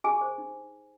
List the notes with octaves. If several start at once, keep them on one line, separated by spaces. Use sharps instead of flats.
G4 G#4 G#5
C5
D#4